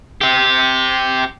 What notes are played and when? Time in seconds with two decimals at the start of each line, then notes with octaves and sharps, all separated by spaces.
0.21 C4 G4